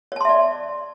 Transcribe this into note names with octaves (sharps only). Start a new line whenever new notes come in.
C#5 D5 E5 A5 C6